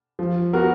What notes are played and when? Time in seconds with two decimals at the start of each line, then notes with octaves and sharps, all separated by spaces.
0.19 F3
0.53 B3 F#4 A#4